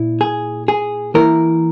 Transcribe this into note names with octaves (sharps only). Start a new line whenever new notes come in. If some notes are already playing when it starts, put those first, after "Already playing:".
Already playing: A#2 E4
G#4
G#4
E3 A#3 E4 A#4